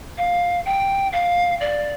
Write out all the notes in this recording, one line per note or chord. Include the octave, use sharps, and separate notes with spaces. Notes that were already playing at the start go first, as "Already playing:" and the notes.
F5
G5
F5
D5